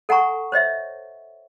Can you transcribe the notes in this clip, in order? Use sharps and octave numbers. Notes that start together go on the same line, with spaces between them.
A4 F#5 G#5 A#5 C#6
C5 C#5 D#5 E5